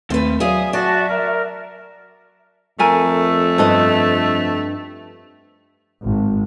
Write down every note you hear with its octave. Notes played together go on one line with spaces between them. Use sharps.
D#2 A3 A#3 C4 B4
F#3 G#4 D5 E5 F5 D#6
F#4 D5 A5
A#4
F2 A3 A#4 G#5 A#5
G2 B3 A4 B4 C5 D#5
G#1